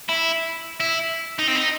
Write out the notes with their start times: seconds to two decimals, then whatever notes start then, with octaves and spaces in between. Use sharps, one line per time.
0.09 E4
0.80 E4
1.39 D#4
1.47 C4
1.55 D#4